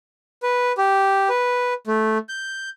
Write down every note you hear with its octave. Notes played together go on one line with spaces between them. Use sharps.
B4
G4
B4
A3
G6